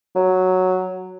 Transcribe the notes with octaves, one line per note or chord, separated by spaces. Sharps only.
F#3